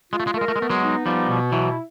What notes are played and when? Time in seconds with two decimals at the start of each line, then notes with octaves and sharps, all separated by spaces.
0.12 G#3 F4
0.20 A3
0.27 G#3
0.34 A3 A#4
0.41 G#3
0.48 A3
0.56 G#3
0.60 A3 B3
0.70 F#3 G#3
0.83 D#4
1.06 F3 G3 B3
1.29 B2
1.52 E3 F#3 E4